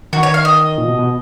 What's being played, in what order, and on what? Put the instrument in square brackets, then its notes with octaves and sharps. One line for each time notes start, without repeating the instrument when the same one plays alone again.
[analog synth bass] D#3 [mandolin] F#4
[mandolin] C#5
F5
D#5
[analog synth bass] A#2
B2
B2